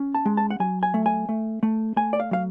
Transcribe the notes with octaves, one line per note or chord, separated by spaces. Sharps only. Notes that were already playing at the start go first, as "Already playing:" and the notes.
Already playing: C#4
A5
G#3
A5
F#5
F#3 G#5
G#5
A3
G#5
A3
A3
A3 G#5
D5
F5
F#3 F5